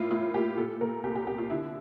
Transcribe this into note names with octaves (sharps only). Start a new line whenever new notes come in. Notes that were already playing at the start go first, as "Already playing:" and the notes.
Already playing: A2 A#3 E4 F4
A2 F4
A#3 G4
A#2 A4
A#2 A#4
C2 G4
G4
C2 G4
F4
D3 E4